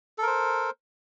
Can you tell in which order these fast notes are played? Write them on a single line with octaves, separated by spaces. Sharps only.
A4 A#4 C5